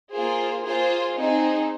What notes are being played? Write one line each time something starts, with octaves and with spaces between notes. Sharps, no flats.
A#3 F4 G#4 C5
A#3 F4 G#4 C5
C4 D#4 G#4